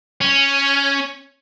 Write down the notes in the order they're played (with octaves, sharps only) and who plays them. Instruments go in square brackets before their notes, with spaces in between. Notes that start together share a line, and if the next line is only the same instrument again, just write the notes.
[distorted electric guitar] C#4